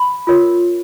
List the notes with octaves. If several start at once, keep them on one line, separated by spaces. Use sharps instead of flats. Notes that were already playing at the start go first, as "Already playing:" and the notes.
Already playing: B5
F4 A#4 C#5